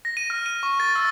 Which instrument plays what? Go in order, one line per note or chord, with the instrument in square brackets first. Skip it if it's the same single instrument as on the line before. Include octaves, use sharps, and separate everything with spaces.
[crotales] A#6
D#7
F6
D#7
C#6
A6
E6